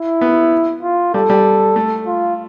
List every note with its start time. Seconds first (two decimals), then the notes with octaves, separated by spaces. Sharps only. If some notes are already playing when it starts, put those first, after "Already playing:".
Already playing: E4
0.21 B3
0.83 F4
1.14 G3 A4
1.30 G3
1.76 A3
2.07 F4